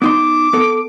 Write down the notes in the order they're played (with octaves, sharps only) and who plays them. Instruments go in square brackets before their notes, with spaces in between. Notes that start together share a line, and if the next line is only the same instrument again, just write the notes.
[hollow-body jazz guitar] B3 D#4 C6 [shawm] D6
[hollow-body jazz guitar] B3 A4